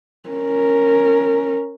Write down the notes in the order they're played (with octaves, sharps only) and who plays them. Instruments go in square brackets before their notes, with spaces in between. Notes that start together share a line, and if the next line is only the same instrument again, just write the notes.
[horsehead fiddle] C#4 A#4